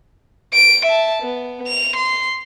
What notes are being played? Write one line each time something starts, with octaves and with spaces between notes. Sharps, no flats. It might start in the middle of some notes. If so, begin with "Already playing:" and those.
D7
E5 A5
B3
F7
C6